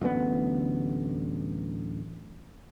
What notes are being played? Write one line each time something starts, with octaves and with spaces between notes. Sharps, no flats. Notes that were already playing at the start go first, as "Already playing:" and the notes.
D1 A1 D2 B3